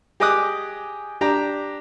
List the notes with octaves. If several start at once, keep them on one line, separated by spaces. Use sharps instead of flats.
G4 G#4 D#5 D6 D#6 F#6
D4 G4 A#5